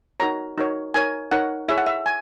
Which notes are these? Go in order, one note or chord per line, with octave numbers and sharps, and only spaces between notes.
D#4 F#4 A#4 C#5 A#5
D#4 F#4 A#4 C#5
D#4 A#4 C#5 G#5
D#4 A#4 C#5 F#5
E4 G#4 C#5 E5
F#5
E5
G#5